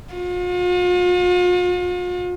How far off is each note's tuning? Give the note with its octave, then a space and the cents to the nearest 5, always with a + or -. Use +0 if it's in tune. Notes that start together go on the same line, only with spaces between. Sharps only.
F4 +45